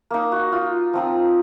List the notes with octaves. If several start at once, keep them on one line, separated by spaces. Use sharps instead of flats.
A#3 D#4
F#4
F4
F3 C4 D#4